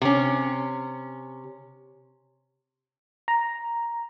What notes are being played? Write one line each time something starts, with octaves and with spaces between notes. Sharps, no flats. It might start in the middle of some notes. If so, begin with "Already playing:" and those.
C3 C#4
A#5